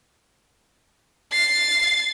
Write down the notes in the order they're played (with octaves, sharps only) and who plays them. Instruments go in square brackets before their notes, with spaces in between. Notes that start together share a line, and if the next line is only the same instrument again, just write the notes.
[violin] A6 C7